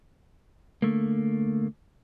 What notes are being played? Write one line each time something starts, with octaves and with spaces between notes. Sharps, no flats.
D3 A3 A#3